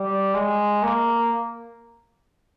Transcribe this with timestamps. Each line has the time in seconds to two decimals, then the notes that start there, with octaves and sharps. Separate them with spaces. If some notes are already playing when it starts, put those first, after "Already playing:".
Already playing: G3
0.34 G#3
0.82 A#3